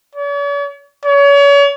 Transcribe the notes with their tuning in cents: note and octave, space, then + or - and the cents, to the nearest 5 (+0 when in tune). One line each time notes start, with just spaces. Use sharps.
C#5 +45
C#5 +35